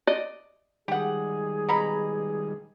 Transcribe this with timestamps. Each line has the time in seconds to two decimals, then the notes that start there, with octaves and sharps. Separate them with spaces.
0.07 D5 D#5
0.88 D#3 G3 G#3 G4 G#4 F#5
1.69 B2 A#5 B5